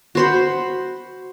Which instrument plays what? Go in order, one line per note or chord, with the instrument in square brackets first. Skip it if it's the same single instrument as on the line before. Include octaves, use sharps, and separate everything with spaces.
[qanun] F#4 C5 B5